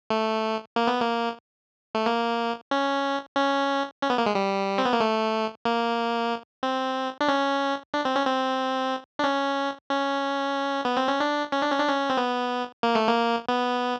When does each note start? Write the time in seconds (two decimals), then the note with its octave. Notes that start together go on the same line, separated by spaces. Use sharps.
0.10 A3
0.76 A#3
0.87 B3
1.00 A#3
1.95 A3
2.06 A#3
2.71 C#4
3.37 C#4
4.02 C#4
4.10 B3
4.18 A#3
4.26 G#3
4.35 G3
4.78 C4
4.85 B3
4.93 A#3
5.00 A3
5.65 A#3
6.63 C4
7.21 D4
7.28 C#4
7.94 D4
8.05 C4
8.16 C#4
8.26 C4
9.19 D4
9.24 C#4
9.89 C#4
10.85 B3
10.97 C4
11.08 C#4
11.20 D4
11.52 C#4
11.62 D4
11.71 C#4
11.80 D4
11.89 C#4
12.10 C4
12.17 B3
12.83 A#3
12.95 A3
13.08 A#3
13.49 B3